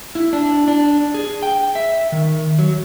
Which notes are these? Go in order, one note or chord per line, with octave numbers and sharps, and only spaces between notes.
E4
D4
D4
G#4
G5
E5
D#3
F#3